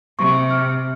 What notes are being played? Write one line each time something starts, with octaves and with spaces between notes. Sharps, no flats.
C3 C#6
F6